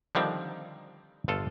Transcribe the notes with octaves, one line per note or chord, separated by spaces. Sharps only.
D3 D#3 F3 G3 C4
G1 F4 A4